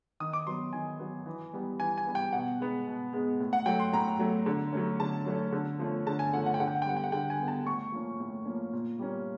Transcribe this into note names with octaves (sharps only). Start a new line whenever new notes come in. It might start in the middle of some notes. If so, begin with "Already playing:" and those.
D#3 D#6
D6
F#3 B3 C6
D#3 G#5
F#3 B3
E3
G3 B3
E3 G#5
G#5
G3 B3
G5
B2 F#5
G#3 B3
B2
G#3 B3
A2
F#5
F#3 A3 G5
C6
A2 A#5
F#3 A3
D3
F#3 A3 C#4
D3 A5
F#3 A3 C#4
D3
F3 A3 C#4
D3 A5
G#5
F3 A3 C#4 F#5
F#5
G5
D3 F#5
G5
F#5
G5
G3 B3 F#5
G5
F#5
D3 G5
G#5
G3 B3
A5
A2 C#6
F3 A#3 C#4
A2
F3 A#3 C#4
A#2
G3 A#3 C#4